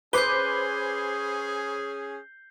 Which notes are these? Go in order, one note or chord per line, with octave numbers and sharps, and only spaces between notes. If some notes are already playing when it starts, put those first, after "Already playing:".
C#4 G#4 B4 C5 D6 G6 C7 G7